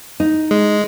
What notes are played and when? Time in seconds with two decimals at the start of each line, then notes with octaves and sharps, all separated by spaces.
0.20 D#4
0.51 G#3